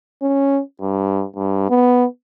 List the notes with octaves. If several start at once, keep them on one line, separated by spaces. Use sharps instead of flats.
C#4
G2
G2
B3